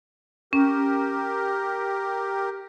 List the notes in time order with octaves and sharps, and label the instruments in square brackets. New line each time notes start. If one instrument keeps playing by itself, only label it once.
[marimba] C#4 [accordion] G4 A#4